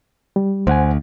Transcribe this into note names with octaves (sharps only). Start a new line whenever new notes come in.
G3
D2 C5 F#5 G#5